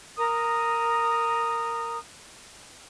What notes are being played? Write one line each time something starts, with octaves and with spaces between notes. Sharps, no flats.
A#4 A#5 D#6